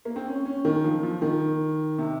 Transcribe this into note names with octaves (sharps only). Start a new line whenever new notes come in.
A#3
C4
C#4
C#4
D#3
F3
F3
D#3
C3